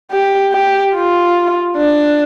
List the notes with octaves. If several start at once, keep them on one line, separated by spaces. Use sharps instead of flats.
G4
G4
F4
D4